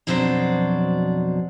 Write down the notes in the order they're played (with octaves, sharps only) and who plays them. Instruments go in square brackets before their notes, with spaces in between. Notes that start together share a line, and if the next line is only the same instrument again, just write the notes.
[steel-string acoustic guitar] F2 B2 F#3 D4 G4 C5